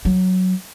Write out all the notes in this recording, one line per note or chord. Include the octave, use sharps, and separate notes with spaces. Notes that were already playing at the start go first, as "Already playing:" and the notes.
F#3